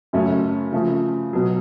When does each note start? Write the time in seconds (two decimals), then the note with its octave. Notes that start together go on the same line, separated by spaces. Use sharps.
0.13 F#2 C#3 F#3 A3 C#4
0.73 C#3 F3 A3
1.33 B2 F#3